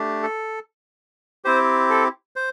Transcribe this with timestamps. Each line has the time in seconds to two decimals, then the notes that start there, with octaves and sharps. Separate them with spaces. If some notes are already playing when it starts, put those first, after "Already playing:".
Already playing: A3 D4 G4
0.23 A4
1.45 C4 E4 G4 C5
1.90 A4
2.36 C5